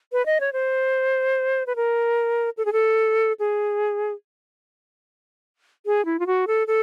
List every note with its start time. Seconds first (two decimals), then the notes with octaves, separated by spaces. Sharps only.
0.12 B4
0.26 D#5
0.40 C#5
0.53 C5
1.67 B4
1.76 A#4
2.58 A4
2.65 G#4
2.73 A4
3.40 G#4
5.86 G#4
6.05 E4
6.20 F4
6.27 F#4
6.47 A4
6.67 A4